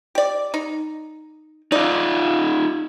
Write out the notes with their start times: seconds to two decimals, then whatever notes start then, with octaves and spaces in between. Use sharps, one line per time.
0.15 G4 D5
0.54 D#4
1.72 D#4 F4 D5